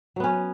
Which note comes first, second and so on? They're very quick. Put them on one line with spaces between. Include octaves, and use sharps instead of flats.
F#3 B3 C#4